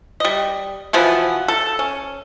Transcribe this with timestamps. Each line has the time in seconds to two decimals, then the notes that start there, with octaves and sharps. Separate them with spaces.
0.20 G3 D#5
0.93 B2 E3 F3 B3
1.48 A4
1.79 C#4